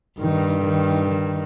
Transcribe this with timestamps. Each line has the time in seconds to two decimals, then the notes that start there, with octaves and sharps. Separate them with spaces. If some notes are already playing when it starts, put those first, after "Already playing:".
0.19 G2 D#3
0.65 D#3
1.11 D#3